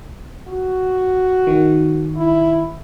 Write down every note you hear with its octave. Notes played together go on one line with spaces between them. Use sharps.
F#4
D#3
E4